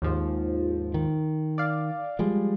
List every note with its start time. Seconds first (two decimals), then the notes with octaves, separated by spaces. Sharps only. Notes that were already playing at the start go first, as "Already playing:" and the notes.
0.02 D#2 G#2 F3
0.94 D#3
1.58 D5 F5
2.19 F3 G3 G#3